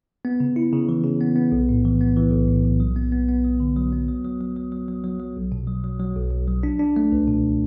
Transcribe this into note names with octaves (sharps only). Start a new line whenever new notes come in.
B3
C#3
E4
C#3
E3
C#3
B3
B3
B1
A2
E3
B3
E3
B1
A2
B1
F#3
B3
B3
B3
F#3
D3
F#3
B3
F#3
F#3
F#3
F#3
F#3
F#3
F#3
F#3
B1
B2
F#3
F#3
F#3
B1
B1
F#3
D4
D4
A3
C#2
B2